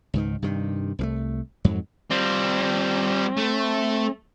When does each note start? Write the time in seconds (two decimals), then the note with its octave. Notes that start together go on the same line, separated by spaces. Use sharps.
0.14 C#2 G#2 D#3
0.42 G2 C3 D#3
0.99 C2 E3 A3
1.65 F2 G#2 F#3
2.11 G3 C4 F4
3.37 A3